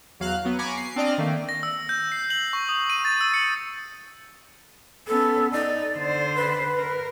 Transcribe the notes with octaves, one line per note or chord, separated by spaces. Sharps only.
E2 F#3 F5 F6 F#6
F#3 B3
G#5 A#5 B5 C#6 D6
C7
C4 D4 D5 D#5 F6
D#3 A3 A#3
A#6
E6
G6
C7
F#7
C#6
D#6
D#7
A6
E6
C#7
B3 C#4 A4
D#4 D5
D3 C5
B4
A#4